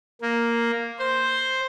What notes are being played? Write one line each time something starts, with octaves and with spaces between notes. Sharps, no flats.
A#3
C5